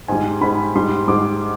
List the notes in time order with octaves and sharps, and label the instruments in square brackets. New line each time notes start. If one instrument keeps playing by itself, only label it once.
[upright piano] G#2 G3 G#5
G#2 G3 B5
G#2 G3 C6
G#2 G3 D6